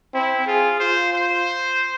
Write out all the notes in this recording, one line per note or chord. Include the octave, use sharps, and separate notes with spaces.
C4 E4
F4 G#4
F4 C5
C5